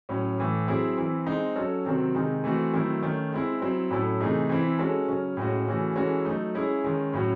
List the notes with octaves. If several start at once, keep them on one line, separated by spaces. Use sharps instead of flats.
A2 F#3 C#4
A2 E3 A3
F#3 C4 E4 G#4
E3 C4 E4
G#3 C4 D#4
F#3 C#4 F#4 A4
C3 D#3 F#3 C4 F#4
C3 D#3 G#3 D#4
E3 A3 C4 F#4
D#3 F#3 A3 C4 E4
D#3 A3 C#4
G#3 C4 E4
F#3 C4 E4
A2 F#3 C#4 E4 A4
C3 E3 A3 D#4 G#4
E3 C4 E4
G#3 C#4 F#4 A4
C#3 F#3 C#4
A2 G#3 C#4 F#4
C#3 E3 A3 C#4 F#4
E3 G#3 C#4 F#4 A4
F#3 A3 D#4
G#3 C#4 E4 G#4
D#3 G#3 C#4
A2 F#3 C#4 F#4